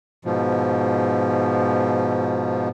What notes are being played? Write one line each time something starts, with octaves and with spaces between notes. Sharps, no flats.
G#2 B2 F3